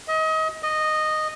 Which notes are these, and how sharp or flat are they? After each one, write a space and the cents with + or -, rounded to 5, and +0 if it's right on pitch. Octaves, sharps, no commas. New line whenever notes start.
D#5 +30
D#5 -10